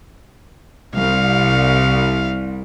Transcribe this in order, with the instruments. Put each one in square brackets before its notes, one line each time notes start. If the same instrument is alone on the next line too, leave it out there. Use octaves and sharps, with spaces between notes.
[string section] C2 [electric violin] F5